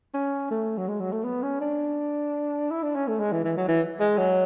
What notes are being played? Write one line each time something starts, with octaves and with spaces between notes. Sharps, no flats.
C#4
A3
F#3
G#3
F#3
A3
B3
C#4
D4
E4
D4
C#4
A3
G#3
E3
E3
F#3
E3
G#3
F#3